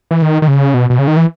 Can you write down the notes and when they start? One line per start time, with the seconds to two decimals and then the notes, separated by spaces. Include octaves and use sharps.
0.11 E3
0.22 D#3
0.42 D#3
0.48 C#3
0.74 B2
0.90 B2
0.99 C#3
1.07 D#3
1.17 E3